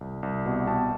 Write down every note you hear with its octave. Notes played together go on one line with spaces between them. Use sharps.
C2
C2
B2
B2 G5 A5